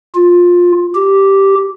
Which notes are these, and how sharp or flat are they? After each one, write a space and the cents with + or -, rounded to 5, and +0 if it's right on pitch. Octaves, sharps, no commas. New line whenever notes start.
F4 +15
G4 -5